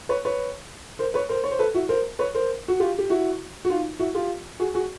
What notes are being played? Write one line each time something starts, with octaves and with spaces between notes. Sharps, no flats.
B4 C#5
B4 C#5
A#4 C5
B4 C#5
A#4 C5
C#5
C5
A4 B4
E4 F#4
A#4 C5
B4 C#5
A#4 C5
F#4
F4 G4
G4
E4 F#4
F#4
D#4 F4
E4 F#4
F4 G4
F#4 G#4
F#4 G#4